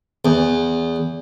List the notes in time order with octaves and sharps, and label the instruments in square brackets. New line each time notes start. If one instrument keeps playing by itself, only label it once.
[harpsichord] E2